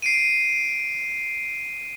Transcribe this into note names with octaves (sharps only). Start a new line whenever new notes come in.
C7 D7 D#7